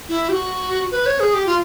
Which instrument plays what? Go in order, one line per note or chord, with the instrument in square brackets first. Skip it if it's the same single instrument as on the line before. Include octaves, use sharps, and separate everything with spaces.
[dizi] E4
G4
F#4
B4
C#5
G#4
G4
F4